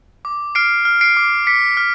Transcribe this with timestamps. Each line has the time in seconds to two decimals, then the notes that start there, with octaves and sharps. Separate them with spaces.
0.25 D6
0.55 F6 C7 D7
0.85 F6
1.01 C7 D7
1.17 D6
1.47 D6 B6 C#7
1.77 F6